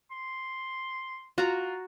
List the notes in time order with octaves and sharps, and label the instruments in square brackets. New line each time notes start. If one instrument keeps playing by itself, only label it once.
[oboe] C6
[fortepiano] F4 [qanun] F#4 A#5